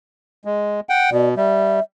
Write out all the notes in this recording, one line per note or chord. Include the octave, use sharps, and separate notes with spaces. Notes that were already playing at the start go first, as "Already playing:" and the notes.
G#3
F#5 G5
B2 D5
G3 E5